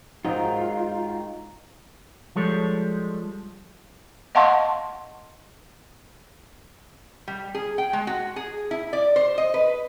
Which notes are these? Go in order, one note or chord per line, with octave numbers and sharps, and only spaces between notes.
G#2 D#3 F#3 F4 D#5 G5
F3 G3 G#3 A4 C#5
D#5 F5 F#5 A5 C6 C#6
G3
G#4
G5
G#3
F#4
G#4
E4
D5
C5
D#5
B4